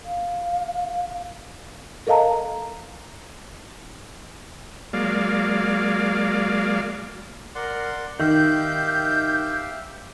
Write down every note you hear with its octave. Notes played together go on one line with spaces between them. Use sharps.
F5
A4 A#4 D#5 F5 A5 A#5
F#3 G#3 A#3 D5 F5
A#4 D5 F#5 C6
D#3 G4 E5 F5 G6